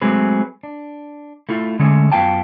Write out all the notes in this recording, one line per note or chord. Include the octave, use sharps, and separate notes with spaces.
F#3 G#3 A3 C4 G#4 B4
D4
A3 E4 F4
D3 G#3 A3 C#4
F#2 B3 F4 F5 G5 A5